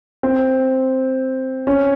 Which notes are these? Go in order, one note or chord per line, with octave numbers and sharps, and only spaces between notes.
C4
C#4